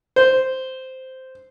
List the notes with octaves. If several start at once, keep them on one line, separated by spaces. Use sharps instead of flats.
C5